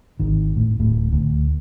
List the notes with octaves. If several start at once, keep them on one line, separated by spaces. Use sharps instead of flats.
G#1 D#3
A2
D1 A2
D2